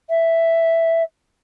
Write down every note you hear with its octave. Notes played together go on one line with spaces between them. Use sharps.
E5